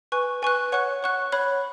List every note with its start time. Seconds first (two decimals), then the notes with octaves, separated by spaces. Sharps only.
0.12 B4 G#5 C#6 F#6
0.42 B4 G#5 C#6 F#6
0.72 C#5 F#5 C#6 F#6
1.03 C#5 F#5 C#6 F#6
1.32 C#5 B5 F#6